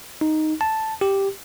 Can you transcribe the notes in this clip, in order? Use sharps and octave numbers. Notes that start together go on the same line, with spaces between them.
D#4
A5
G4